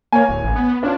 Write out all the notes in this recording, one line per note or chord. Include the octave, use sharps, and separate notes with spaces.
A#3 C#5 G#5
D1
A1
B3
C#4 D4 F4